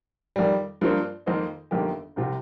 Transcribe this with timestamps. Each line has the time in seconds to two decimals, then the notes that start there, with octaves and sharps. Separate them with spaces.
0.36 F2 D#3 G3
0.81 G2 F3 A#3 F4 C5
1.26 F2 D#3 A#3 D#4 C5
1.71 G1 F2 D#3 A#3 G4
2.16 C2 C3 F3 C4 F4